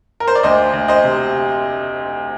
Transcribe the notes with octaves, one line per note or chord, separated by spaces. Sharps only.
A#4
C5
D5
D2 C5 D#5
D2
C5 D#5
C3